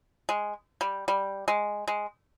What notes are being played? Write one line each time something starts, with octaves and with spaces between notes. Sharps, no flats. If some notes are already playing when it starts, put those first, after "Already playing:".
G#3
G3
G3
G#3
G#3